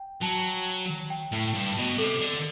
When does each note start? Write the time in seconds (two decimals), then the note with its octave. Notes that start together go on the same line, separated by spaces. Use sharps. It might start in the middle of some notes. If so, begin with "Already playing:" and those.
Already playing: G5
0.22 F#3 A5
1.10 G5
1.33 A2
1.54 G2
1.76 B2
1.98 C3 A4
2.20 D3